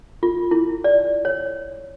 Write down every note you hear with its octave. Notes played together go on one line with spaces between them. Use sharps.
F4
E4
D5
C#5